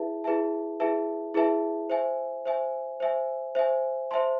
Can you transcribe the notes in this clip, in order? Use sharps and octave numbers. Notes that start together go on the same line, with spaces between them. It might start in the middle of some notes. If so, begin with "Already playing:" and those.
Already playing: E4 G#4 B4 E5 A5
E4 G#4 B4 E5 A5
E4 G#4 B4 E5 A5
E4 G#4 B4 E5 A5
C5 E5 G#5
C5 E5 G#5
C5 E5 G#5
C5 E5 G#5
C5 E5 A5 C6